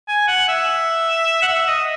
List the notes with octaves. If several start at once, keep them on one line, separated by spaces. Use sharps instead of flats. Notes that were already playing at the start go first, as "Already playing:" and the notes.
G#5
F#5
E5
F#5
E5
D#5